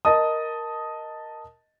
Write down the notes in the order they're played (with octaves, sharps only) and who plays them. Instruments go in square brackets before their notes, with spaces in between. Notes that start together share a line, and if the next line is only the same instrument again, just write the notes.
[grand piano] A#4 D#5 A5 D#6